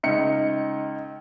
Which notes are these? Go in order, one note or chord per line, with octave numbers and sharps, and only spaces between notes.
C#2 D#4 C#7